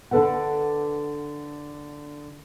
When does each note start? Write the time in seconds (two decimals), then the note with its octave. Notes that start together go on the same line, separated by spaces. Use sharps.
0.11 D3 D4 F4 A4 B4 F#5